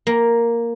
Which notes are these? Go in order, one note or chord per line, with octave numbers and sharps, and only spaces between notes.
A#3